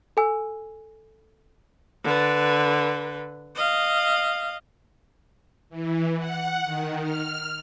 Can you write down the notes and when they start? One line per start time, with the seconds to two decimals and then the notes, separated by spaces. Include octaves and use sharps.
0.17 A4 G#5 E6
2.04 D3 B4
3.56 D#5 F5
5.69 E3
6.18 F#5
6.63 D#3
7.03 F6